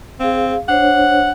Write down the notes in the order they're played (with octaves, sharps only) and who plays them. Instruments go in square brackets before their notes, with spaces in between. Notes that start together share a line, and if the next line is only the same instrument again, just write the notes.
[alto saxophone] C4 [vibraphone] G#4 F5
[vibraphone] D4 C5 C#5 [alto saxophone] F#5